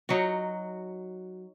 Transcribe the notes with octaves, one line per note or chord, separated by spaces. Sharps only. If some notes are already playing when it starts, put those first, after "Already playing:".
F#3 D#4 F#4